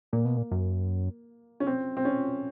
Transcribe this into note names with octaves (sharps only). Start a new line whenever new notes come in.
A#2 A#3
B2
A#2
F#2
C#4
C4
C4
C#4